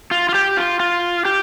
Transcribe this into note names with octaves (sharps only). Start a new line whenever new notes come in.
F4
F4
G4
F4
F4
G4